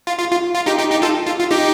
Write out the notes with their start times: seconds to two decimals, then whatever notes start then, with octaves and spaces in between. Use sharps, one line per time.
0.07 F4
0.19 F4
0.31 F4
0.55 F4
0.66 D#4 G4
0.78 D#4 G4
0.91 D#4 G4
1.02 F4 A4
1.26 F4
1.39 F4
1.51 D#4 G4